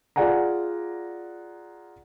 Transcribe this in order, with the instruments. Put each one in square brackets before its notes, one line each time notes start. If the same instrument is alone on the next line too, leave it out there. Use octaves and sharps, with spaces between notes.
[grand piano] F4 G#4 D5 F#5 G#5 A#5